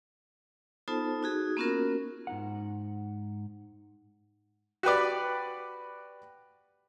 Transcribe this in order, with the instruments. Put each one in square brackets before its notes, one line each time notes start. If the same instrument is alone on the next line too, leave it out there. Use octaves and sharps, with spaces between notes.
[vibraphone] B3 D#4 F4 A4 C5 A5
D#4 F#4 G#4
A#3 B3 C#4 F4 F#4 A#4
[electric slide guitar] G#2 D#4 F#5
[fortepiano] F#4 G4 B4 D5